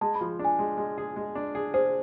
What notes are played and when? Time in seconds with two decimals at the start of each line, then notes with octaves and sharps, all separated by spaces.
0.01 G#3 A5
0.15 B5
0.21 F3
0.39 D4
0.45 G#5
0.59 G#3
0.78 G#3
0.98 G#4
1.16 G#3
1.35 D4
1.55 G#4
1.74 G#4 C5